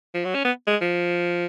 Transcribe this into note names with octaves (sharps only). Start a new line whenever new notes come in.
F3
F#3
C#4
B3
G#3
F3